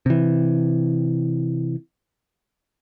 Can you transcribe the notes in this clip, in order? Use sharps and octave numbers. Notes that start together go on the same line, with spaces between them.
C3 E3